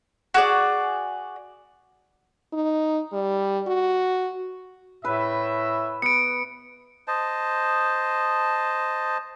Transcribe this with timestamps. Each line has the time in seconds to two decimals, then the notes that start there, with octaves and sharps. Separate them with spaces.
0.34 F#4 G#4 D5
2.53 D#4
3.13 G3
3.67 F#4
5.05 A2 B4 E5
6.02 B3 C#7 D7
7.08 C5 D#5 A5